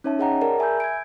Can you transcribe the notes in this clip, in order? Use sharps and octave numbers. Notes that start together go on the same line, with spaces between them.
C#4 D#4 C#5 E5 A5
G#4 C#5 D#5 F#5 G5 A#5
G#4 A#4 D5 A5 A#5
E5 G#5 B5 E6 G6
G#6 D7